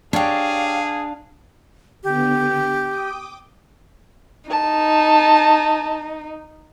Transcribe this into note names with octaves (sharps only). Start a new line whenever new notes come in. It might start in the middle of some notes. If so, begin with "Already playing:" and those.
D4 G4 G#4 C#5 F5
D3 B3 G4
G5 D6 D#6
D#4 A5